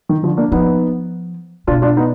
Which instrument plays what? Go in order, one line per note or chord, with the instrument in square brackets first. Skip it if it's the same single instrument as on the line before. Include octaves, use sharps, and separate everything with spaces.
[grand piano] D#3
D3 F3
A#3 D4
[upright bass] F3 [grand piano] B3 D#4
[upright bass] B2 [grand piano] D4 F4
[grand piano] D4 F4
B3 D#4